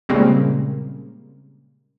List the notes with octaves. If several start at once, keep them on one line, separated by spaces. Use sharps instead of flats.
A#2 C#3 G3 G#3 A#3 C4